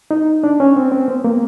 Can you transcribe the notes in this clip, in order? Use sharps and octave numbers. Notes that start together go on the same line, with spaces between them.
D#4
D4
C#4
C4
C4
B3
A#3